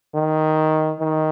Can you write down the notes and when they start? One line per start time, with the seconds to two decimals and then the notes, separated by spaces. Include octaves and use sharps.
0.15 D#3
1.00 D#3